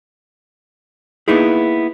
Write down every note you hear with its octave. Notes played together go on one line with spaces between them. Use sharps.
A#3 B3 D#4 E4 G#4